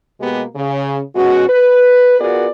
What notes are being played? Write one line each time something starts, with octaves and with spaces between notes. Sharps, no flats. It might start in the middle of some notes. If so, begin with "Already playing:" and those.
B2 G#3 A#3 B3 G4
C#3
B2 G#3 C#4 F#4
B4
B3 F4 F#4 G#4 A#4 D5